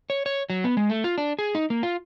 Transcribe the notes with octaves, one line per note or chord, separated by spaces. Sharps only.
C#5
C#5
F#3
B3
G#3
A3
F4
D4
G#4
D#4
A#3
F4